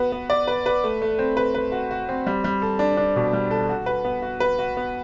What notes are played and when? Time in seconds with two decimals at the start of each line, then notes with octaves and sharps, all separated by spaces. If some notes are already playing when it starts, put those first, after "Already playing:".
Already playing: B3 F#4 B4
0.12 B3
0.30 D5
0.48 B4
0.66 B4
0.84 A3
1.02 A3
1.19 C4
1.37 B4
1.55 B4
1.72 F#4
1.91 F#4
2.09 C4
2.27 G3
2.44 G3
2.62 A4
2.79 D4
2.97 D4
3.16 B2
3.33 G3
3.51 A4
3.69 F#4
3.86 B4
4.05 B3
4.22 F#4
4.40 B4
4.59 F#4
4.77 B3